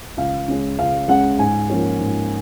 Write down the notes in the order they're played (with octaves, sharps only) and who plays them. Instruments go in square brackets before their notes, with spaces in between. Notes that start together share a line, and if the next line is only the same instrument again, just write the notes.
[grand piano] C#2 F5
C#3 G#3 C#4
C#2 F5
C#3 G#3 C#4 F#5
G#2 G#5
F3 A#3 C#4
G#2